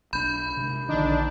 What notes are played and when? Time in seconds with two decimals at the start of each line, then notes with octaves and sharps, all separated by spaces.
0.13 B1 C4 D4 B5 G6
0.57 C3 G#3
0.89 A#1 D3 D#3 D4 D#4